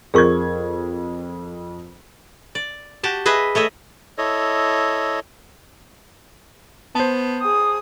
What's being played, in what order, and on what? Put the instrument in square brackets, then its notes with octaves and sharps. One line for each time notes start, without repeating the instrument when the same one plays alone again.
[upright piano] F2 G#6 [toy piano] G#4 A#4 C#6
[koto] D5
F#4 G4 A5
G#4 B4 D#5 E5
A3 C#5 D#5 E5
[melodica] E4 A4 C#5 D#5
[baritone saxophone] B3 [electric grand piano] C5 A5
[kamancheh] G#4 D#6